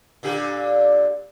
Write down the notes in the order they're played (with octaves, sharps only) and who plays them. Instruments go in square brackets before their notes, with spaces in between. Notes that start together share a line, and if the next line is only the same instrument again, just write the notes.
[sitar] A#2 D3 G4